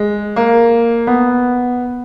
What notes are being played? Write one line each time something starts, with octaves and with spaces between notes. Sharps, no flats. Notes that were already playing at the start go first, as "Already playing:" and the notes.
Already playing: G#3
A#3
B3